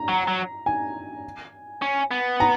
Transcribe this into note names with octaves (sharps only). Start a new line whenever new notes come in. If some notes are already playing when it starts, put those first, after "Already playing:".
Already playing: A#5
F#3
F#3
G#5
C#4
B3
A#5